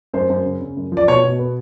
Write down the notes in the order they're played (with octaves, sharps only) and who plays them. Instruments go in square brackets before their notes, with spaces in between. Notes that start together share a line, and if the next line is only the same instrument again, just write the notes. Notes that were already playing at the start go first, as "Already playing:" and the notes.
[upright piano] F#2 C5
F#2
C#3
C#3
F#2
F3
D5
B2 C#5
B2
B3